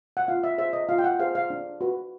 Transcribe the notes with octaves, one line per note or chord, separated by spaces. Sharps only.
F#5
F4 F5
E5
G#4 C5 E5
D#5
F4 F5
G5
F#5
G#4 C5 F5
F5
D4
F#4 B4